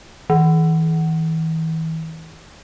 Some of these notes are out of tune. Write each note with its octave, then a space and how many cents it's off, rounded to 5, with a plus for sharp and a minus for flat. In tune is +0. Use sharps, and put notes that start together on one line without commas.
E3 -40